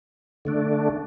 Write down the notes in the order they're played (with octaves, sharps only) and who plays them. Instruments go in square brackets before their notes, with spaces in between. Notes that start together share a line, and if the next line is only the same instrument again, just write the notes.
[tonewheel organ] D3 A3 D4